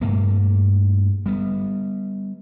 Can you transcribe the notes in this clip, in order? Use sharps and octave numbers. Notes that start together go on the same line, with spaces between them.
G2 A3 A#3
G3 B3